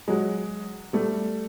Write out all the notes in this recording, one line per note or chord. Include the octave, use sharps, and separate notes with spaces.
F#3 G#3
G3 A3